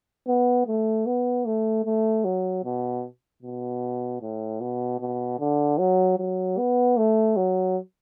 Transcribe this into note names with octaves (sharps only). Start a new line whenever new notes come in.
B3
A3
B3
A3
A3
F#3
B2
B2
A2
B2
B2
D3
F#3
F#3
B3
A3
F#3